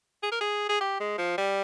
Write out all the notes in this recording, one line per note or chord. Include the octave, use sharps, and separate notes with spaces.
G#4
A#4
G#4
G#4
G4
G#3
F3
G3